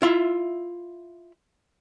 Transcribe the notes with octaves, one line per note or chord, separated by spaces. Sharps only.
E4 F4 E5